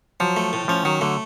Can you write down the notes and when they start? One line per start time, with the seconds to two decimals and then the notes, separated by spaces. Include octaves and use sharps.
0.20 F3 F#3
0.36 A3
0.53 A2
0.68 F3 C#4
0.85 D#3 F#3
1.01 D3 A3